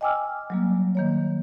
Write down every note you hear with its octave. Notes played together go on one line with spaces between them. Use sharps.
D#5 G5 G#5 D6 E6 F6
F#3 G3 A#3
D#3 A#3 C#5